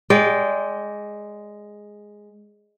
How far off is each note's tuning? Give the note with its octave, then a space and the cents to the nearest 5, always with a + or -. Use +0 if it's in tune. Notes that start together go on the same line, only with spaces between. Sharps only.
G#3 +0 D5 -25 G5 +0